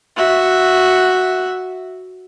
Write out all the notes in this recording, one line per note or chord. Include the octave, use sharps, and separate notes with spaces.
F#4 E5